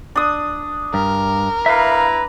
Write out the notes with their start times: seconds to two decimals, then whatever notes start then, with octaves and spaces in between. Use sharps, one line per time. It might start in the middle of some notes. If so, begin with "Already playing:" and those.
0.16 D4 D#6
0.94 G2 A#4
1.66 E4 B4 E5 F5 A#5